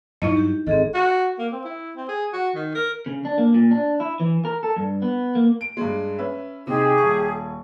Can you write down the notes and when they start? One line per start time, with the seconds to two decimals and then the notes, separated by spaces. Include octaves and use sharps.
0.22 G2 F#3 D#4 E4 D#5
0.37 G4
0.67 G#1 C4 G#4 A4 D#5
0.94 F#4
1.38 A#3
1.52 C4
1.64 E4
1.96 C4
2.08 G#4
2.33 F#4
2.55 D#3
2.75 A#4
3.06 C#3
3.25 D4
3.38 A#3
3.54 A#2
3.71 D4
4.00 E4
4.20 E3
4.45 A#4
4.63 A4
4.76 G2
5.02 B3
5.35 A#3
5.61 D7
5.77 G2 G#3
6.18 C#4 B4 E5
6.67 C3 D#4 G4 G#4
6.98 D#1 C#6